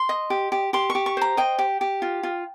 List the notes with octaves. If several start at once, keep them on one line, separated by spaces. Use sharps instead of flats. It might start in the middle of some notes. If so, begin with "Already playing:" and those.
Already playing: C6
D#5
G4
G4
G4 C6
C#6
G4
C#6
C5 A#5
D#5 G5
G4
G4
F4
F4